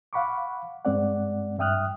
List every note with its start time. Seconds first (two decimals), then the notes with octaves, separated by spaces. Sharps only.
0.13 F5 F#5 B5 C#6 D6
0.85 G2 G#3 C4 D5 F#5
1.59 G2 E5 G5 D#6 F6 F#6